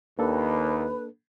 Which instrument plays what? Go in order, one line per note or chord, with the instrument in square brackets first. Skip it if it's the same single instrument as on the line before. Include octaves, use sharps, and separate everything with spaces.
[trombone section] D#2 [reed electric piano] A#3 D4 A4 [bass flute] B4